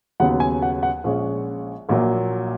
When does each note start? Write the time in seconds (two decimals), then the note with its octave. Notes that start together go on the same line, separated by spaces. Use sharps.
0.20 D#2 C#3 F#3 B3 F#5
0.40 G#5
0.62 F#5
0.83 F#5
1.04 A#1 A#2 G#3 C#4
1.89 A#1 A#2 F#3 A#3